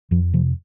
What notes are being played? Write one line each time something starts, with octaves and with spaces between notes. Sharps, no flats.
F2 F3
C3 F3